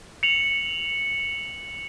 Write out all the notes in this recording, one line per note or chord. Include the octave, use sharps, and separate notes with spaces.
C#7 F7 F#7